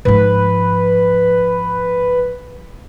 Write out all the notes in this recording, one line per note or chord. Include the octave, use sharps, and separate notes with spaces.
G#2 F3 B4